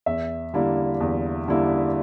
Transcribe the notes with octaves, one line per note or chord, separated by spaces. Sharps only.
E2 E5
D3 G3 A#3 E4
E2
D3 G3 A#3 E4